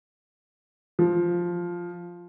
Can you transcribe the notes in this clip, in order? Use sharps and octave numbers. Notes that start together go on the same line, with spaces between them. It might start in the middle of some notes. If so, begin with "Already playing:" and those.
F3